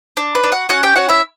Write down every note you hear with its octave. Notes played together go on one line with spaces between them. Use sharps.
D4
B4
D4
F#4 F#5
C#4 F#4 F#5
G4 G5
C#4 F#4 F#5
E4 E5